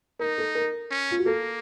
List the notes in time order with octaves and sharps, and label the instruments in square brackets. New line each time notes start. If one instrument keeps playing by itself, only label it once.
[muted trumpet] D#4 [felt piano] A#4
[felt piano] A4
A#4
[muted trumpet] C#4
[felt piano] F4
F#4
[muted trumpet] A#3 [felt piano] A4